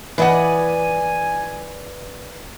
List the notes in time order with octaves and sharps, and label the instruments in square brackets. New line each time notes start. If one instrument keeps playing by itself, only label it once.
[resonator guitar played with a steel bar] E3 D#5 F#5 [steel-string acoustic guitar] B4 D5 [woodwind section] G#5